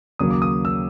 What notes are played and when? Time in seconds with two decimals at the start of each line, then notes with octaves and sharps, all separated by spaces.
0.19 D#2 C#3 F#3 A#3 D#6
0.31 D6
0.42 D#6
0.65 E6